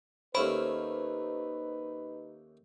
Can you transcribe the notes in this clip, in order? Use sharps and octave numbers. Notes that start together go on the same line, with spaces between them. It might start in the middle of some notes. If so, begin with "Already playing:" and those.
D#2 A3 C#4 D#4 B4 C5 B5